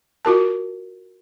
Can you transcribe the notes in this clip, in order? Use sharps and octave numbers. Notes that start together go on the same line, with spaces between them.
F4 F#4 A#4 A5